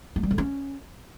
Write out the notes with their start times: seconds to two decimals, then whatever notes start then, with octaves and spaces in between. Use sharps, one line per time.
0.16 G#3
0.23 G3
0.31 D3
0.38 C#4